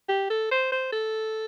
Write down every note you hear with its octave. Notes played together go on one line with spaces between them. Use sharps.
G4
A4
C5
C5
A4